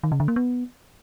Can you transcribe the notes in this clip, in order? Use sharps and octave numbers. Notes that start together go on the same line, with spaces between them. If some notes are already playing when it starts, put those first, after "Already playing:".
D#3
C#3
D3
A#3
B3